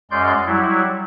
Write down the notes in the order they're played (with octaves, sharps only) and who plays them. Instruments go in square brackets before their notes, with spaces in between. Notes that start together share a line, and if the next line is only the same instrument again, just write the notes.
[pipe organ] F#2 G#3 C#4 D5 C6 G6
F#3 G3 E4